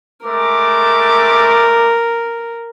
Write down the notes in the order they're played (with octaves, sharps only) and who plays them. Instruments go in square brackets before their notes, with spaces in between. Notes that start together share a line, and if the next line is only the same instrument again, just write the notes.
[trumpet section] G#3 A3 D6 [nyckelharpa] A#4